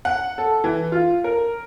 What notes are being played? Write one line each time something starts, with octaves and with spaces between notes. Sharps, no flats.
F#5
A4
E3
F4
A#4